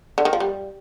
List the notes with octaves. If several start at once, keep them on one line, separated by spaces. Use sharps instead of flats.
D3
D#3
F3
G3